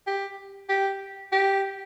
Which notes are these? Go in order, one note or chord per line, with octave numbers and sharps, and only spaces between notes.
G4
G4
G4